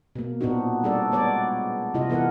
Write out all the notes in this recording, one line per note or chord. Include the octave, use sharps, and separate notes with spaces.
B2 A#3
A#2 B3 C4 D4 D#4 F#4
G3 D4 A4 D5
G#3 B3 C#5 D5
C3 E4 F4 D#5
E3 B3 A4 A#4 F#5